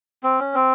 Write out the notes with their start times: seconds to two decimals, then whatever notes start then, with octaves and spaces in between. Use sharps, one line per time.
0.23 C4
0.39 C#4
0.55 C4